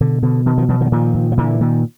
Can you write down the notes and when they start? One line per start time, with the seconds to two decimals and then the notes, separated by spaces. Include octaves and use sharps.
0.01 B2 D3
0.22 B2 D3
0.46 B2 D#3
0.58 D#3 F3
0.68 B2 E3 F#3
0.81 D#3 F3
0.86 F#3
0.92 A#2 D#3 F3
1.14 A#2
1.32 F3
1.37 A#2 D3 E3
1.61 A#2 D#3